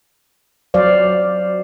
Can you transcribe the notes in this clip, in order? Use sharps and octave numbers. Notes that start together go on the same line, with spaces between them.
F#3 C5 D5 F5